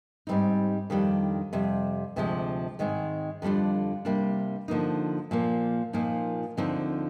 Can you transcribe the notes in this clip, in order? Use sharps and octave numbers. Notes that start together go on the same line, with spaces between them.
G#2 G3 C4 D#4
F2 D#3 G3 D4
F2 C3 G3
D2 C3 F3 G#3
G#2 D#3 G#3 C4
F2 D3 G3 D4 F4
C3 G3 A#3 D4
D3 F3 A#3 D#4
A#2 F3 A#3
A#2 F3 A#3 D#4
D2 D3 F3 C4 D#4